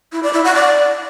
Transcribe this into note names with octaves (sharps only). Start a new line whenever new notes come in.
E4
D5
E4
F#5
D5